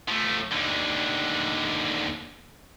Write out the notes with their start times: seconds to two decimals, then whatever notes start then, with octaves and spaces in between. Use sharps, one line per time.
0.08 F3 A3
0.51 D#2 D3